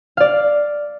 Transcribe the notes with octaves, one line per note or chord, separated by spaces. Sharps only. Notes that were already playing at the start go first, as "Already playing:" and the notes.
D5 F5